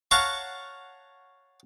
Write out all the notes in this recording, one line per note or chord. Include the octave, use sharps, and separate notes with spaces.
C#5 F5 F#5 A5 A#5 C#6